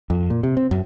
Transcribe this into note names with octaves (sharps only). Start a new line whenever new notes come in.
F2
A#2
C3
C4
F#2